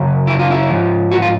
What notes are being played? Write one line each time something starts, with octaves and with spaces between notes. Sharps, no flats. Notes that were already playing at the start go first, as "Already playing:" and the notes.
Already playing: F#2 C#3
E4
F4
E4
G#2 F3
F#4
F4